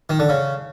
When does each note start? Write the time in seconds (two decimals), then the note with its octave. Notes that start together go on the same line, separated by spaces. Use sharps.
0.10 D#3
0.19 D3
0.29 C#3